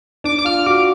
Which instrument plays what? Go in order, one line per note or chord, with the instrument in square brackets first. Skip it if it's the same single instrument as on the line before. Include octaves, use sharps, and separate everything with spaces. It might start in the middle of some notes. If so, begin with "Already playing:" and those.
[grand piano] D4 [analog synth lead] D6
[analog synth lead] D6
[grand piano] F4 [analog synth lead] F6
[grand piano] F#4 [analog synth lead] D6